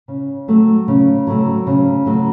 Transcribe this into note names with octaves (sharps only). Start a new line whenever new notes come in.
C#3
F#3 A3 C4
C#3
F#3 A3 C4
C#3
F#3 A3 C4